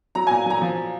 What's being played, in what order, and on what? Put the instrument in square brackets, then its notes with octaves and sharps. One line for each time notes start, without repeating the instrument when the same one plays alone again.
[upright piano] F#3 A#5
G#5
A#2
F#3 A#5
F3